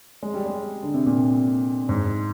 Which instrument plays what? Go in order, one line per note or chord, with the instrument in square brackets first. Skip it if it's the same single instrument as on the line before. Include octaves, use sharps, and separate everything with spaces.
[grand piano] G#3
G3
G#3
D3
C3
A#2
G#2